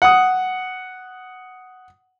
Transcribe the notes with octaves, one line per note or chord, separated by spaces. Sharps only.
F#5 D#6